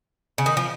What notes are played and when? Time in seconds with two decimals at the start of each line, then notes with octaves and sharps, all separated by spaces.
0.38 C#3
0.46 D#3
0.57 F3